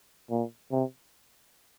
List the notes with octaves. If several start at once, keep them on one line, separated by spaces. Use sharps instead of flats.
A#2
C3